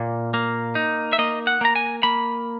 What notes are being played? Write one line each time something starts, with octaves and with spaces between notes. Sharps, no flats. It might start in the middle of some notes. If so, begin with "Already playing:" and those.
Already playing: A#2 A#3
A#3
D#4
E5
A#3 D#5
F#5
A#3 A#5
G#5
A#3 B5